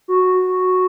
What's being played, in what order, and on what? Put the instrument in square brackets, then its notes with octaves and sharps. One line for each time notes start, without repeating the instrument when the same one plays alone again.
[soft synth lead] F#4